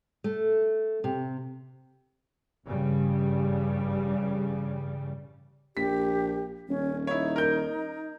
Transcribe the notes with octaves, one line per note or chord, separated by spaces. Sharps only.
A3
C3
A1 G2 C#3 G3
A#1 G4 B6
D#1 C#4
D#4 E4 C#5
A#4 G6